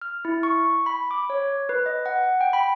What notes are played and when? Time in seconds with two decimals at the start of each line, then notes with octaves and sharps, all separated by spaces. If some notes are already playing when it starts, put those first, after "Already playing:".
0.02 F6
0.25 E4
0.43 C#6
0.86 B5
1.11 D6
1.30 C#5
1.69 B4
1.86 D#5
2.06 F#5
2.41 G5
2.53 B5